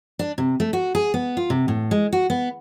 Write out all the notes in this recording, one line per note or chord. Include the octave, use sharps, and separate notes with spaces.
D4
C3
A3
F#4
G#4
B3
F4
C3
A2
G#3
F#4
B3